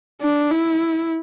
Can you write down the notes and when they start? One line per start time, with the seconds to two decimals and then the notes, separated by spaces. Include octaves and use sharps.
0.21 D4
0.51 E4